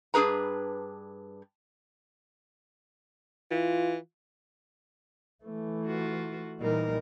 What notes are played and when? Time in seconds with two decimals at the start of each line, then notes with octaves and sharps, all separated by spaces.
0.14 G2 D4 G#4 B4 A#5
3.51 E3 F4
5.44 E3 A3
5.85 F4 F#4
6.60 A#2 E3 G3 D#4 A#4